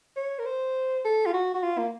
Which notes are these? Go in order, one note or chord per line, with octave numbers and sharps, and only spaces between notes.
C#5
A#4
C5
A4
F4
F#4
F#4
F4
A#3